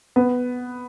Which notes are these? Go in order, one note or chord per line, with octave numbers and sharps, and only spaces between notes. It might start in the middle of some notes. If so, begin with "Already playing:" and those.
B3